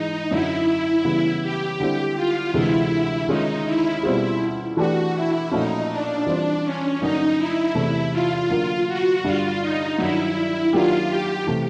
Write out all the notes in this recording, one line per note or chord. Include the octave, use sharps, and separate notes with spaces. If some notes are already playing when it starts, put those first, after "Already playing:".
Already playing: G#2 E3 G#3 D#4 E4
F#2 D3 F#3 E4
C#3 E3 G3 B3
G4
D3 G3 C4 E4
F4
D2 C3 E3 G#3 E4
D#3 G#3 C#4 D#4 F4
E4
B2 G3 C4 E4 F4 G#4
E3 A3 D4 F#4 G4
E4
A#2 F3 A3 C#4 D#4 F#4
D4
E3 G3 C4 D4 F4
C#4
G2 D3 F#3 A#3 D4 D#4
E4
E2 C3 E3 A3
F4
D3 F#3 A#3
F#4
G2 D3 G3 F4
D#4
G2 D#3 F#3 E4
D#3 F#3 A#3 D4 F4 G4
G4
C3 E3 A3